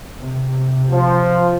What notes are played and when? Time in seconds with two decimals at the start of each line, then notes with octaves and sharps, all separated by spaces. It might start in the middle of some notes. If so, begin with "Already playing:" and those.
0.19 C3
0.91 F3